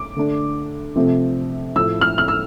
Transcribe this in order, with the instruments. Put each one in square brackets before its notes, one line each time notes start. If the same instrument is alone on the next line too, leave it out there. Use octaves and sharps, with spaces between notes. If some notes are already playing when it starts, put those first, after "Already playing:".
Already playing: [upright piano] D6
D3 A3 D4
C3 F3 A3 C4
A2 F3 A3 E6
F6
F6
E6